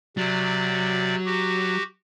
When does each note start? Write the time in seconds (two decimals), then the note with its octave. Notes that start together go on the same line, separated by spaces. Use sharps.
0.17 C3 F#3 D5
1.26 F#4 G4